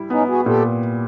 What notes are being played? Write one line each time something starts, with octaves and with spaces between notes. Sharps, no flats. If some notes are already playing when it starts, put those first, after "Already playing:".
Already playing: G3 E4
B3 C#4 D#4
F#4 G#4
A#2 G4 A4